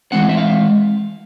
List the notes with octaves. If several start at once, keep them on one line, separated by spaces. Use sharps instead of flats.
E3 G#3 C4 F#5
E5
F5